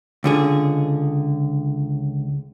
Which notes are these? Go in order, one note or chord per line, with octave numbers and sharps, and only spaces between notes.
C#2 D3 G#4